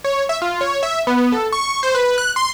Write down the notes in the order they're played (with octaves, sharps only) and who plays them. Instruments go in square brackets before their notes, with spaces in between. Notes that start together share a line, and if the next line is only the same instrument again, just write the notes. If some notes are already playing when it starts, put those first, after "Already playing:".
[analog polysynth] C#5
E5
F4
C#5
E5
B3
A4
C#6
C5
B4
F#6
C6